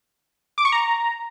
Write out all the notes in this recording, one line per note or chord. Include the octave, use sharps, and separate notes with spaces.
D6
C#6
A#5